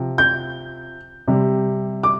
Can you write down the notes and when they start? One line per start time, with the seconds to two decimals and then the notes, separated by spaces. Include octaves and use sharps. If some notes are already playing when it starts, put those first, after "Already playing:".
Already playing: C3 F3
0.18 G6
1.28 C3 G3
2.03 D6